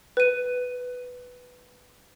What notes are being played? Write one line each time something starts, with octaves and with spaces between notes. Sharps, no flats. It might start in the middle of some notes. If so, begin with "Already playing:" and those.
B4 D#7